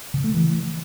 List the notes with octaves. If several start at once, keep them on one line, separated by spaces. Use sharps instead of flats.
C#3
A3
E3